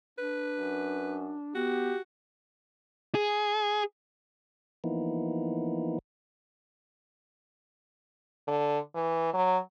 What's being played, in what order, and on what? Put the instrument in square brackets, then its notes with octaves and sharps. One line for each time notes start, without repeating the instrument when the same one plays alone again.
[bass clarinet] D4 [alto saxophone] B4
[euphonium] F#2
[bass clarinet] B3 [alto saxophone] F#4 [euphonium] G4
[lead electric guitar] G#4
[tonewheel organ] E3 F3 A#3 B3 D#4 E4
[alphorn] D3
E3
F#3